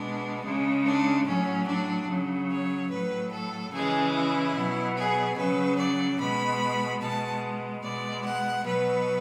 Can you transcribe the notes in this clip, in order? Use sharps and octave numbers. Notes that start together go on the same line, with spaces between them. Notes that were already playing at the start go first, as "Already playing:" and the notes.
Already playing: B2 G#3 D4
C#3 G#3
D4
A2 F#3 C#4
D4
C#3 F#3
C#5
A2 F#3 B4
A4
C#3 E3 G#3 G#4
E4
B2 F#3
G#4
C#3 F#3 B4
D5
B2 G#3 B5
B2 G#3 A5
B2 G#3 D5
F#5
B2 F#3 B4